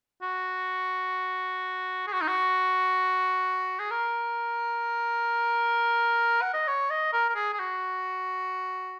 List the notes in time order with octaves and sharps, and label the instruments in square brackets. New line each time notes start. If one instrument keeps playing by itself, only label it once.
[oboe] F#4
G#4
F#4
D#4
F#4
G#4
A#4
F#5
D#5
C#5
D#5
A#4
A#4
G#4
G#4
F#4